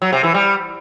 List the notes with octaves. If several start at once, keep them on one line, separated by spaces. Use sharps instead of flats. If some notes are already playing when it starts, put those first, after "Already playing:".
F#3
C3
E3
G3